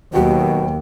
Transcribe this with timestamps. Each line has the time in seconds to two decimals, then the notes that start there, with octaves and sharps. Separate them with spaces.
0.14 D#2 B2 F#3 F#4 G4 G5